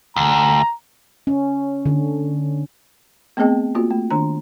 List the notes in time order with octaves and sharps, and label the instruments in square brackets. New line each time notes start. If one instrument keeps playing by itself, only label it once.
[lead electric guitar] D2 [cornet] A#5
[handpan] C#4
D3
[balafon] A3 B3 C4 G#4 D#5 G5
A#3 F4 F#4
A3
D#3 D4 A#5